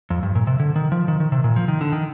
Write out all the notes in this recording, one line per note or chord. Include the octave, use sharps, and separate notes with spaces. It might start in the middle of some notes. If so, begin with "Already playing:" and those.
F2
G2
A#2
C3
D3
D#3
F3
D#3
D#3
C3
A#2
F3
D#3
D3
D#3